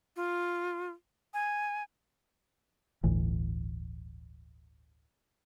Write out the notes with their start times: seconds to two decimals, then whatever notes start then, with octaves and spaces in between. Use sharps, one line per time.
0.16 F4
1.34 G#5
3.04 G1 D2 A2 E3